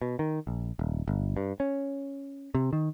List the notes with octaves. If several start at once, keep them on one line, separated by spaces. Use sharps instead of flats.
B2
D#3
A#1
D#1
G1
G2
C#4
C3
D#3